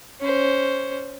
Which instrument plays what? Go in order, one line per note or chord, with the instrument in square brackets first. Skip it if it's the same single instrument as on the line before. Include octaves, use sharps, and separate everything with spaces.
[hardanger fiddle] C#4 C5